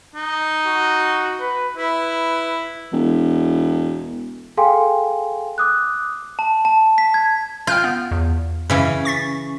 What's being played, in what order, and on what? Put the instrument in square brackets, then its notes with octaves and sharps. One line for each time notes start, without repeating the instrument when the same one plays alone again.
[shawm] D#4
[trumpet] F#4
B4
[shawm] E4 [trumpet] B4
[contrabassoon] E1
[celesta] G#4 A4 F5 G5 G#5 C6
D6 D#6 F#6
[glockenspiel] A5
A5
B6
G#6
[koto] F4 [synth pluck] G5 F6 G6
[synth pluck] B3
E2
[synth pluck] F#2 [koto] C#3 E3 C#4
[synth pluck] C#6 A6 B6